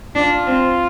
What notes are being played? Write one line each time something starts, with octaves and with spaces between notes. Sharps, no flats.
D4 F4
C4